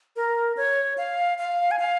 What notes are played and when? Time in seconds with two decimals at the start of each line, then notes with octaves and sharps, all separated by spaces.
0.16 A#4
0.57 C#5
0.98 F5
1.38 F5
1.71 G#5
1.79 F5